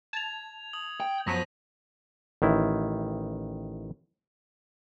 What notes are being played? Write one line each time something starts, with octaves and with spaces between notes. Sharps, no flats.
A5 G#6 F7
D#6 F#7
G5
F#2 F3 F#3 B3 A#6 B6 D#7
A1 D#3 E4